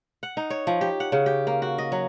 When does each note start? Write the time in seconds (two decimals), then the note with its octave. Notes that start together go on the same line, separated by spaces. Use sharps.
0.23 F#5
0.37 D#4
0.50 C#5
0.67 F3
0.81 G4
1.00 F#5
1.12 C#3
1.26 G4
1.47 A#3
1.62 F#4
1.78 D#5
1.92 F#3